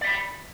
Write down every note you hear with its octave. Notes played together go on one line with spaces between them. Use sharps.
D5 E5 B5